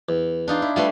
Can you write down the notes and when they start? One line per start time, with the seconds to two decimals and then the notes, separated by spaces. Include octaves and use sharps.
0.09 E2
0.48 D4 D#4 F4
0.62 E4
0.76 G3 A3 F4 A4 B4 C6